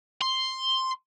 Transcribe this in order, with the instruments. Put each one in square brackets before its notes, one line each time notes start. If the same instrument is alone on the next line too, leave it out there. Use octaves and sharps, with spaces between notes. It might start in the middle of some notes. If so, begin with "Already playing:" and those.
[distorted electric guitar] C6